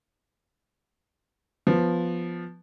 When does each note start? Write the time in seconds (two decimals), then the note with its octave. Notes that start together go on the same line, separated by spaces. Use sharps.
1.67 F3 B3